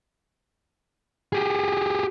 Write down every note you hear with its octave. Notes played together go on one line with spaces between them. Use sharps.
G4 G#4